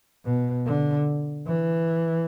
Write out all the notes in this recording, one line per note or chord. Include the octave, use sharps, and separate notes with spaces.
B2
D3
E3